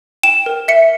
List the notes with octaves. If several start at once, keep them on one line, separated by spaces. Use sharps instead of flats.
G5 E7
A#4
E5 C#7